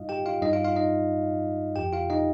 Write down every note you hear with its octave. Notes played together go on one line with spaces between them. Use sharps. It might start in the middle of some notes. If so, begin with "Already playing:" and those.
Already playing: G2 G3 D#4 F4 D#5 F5
G4 G5
F4 F5
G2 G3 D#4 D#5
F4 F5
F4 F5
D#4 D#5
F2 F3 G4 G5
F4 F5
D#4 D#5